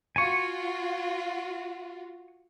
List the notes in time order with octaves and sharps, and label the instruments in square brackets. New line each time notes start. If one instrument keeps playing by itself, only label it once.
[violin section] F4 F#4 [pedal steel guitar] G#5 C#6